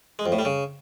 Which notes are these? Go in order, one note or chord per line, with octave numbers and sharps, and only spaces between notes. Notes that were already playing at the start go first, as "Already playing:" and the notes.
G#3
F2
A2
G3
C#3